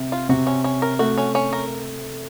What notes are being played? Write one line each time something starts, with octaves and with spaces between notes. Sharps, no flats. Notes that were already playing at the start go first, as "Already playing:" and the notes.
Already playing: C3
F4
C3 F#4
C#4
C#4
A#4
A3 F#4
C#4
C#4
A#4